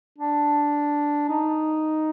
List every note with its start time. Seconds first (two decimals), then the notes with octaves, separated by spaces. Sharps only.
0.18 D4
1.29 D#4